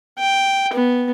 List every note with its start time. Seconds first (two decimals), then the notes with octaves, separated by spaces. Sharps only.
0.18 G5
0.73 B3